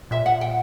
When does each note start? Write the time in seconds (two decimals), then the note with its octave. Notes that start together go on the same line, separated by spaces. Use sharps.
0.11 A#2 E5
0.26 F#5
0.41 G5